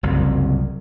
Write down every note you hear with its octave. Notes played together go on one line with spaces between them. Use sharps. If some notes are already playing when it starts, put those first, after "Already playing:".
F#1 C2 F2